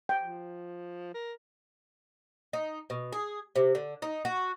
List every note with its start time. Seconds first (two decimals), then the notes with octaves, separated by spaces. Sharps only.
0.09 G5
0.23 F3
1.14 A#4
2.53 D#4
2.90 B2
3.13 G#4
3.56 C3
3.75 D3
4.02 D#4
4.25 F#4